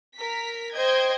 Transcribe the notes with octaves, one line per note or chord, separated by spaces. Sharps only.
A#4 B6
C5 D#5 G5 G#6